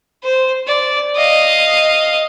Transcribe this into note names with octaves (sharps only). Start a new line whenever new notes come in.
C5
D5
D#5 F5